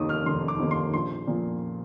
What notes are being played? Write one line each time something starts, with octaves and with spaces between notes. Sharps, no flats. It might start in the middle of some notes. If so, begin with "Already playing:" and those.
Already playing: F1 D#2 D#3 A#3 D6 D#6
F6
F1 C6
D6
D#2 D#3 A#3
C6
A#1 C6
A#2 F3 A#3